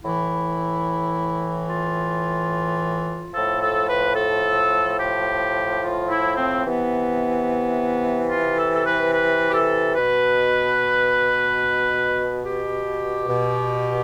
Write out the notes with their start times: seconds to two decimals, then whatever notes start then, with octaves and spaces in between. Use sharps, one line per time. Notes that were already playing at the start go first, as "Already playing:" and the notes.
0.02 A2 E3 E4
1.68 F4
3.33 A2 F3 A4
3.62 A4
3.89 B4
4.16 A4
5.00 G4
5.82 F4
6.10 E4
6.37 C4
6.64 C3 E3 B3
8.30 F4
8.58 A4
8.74 A4
8.85 B4
9.13 B4
9.49 G4
9.54 A4
9.96 B2 B4
12.44 G4
13.28 B2